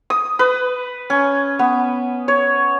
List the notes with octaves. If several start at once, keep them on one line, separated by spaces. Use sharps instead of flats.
D#6
B4
C#4
B3
C#5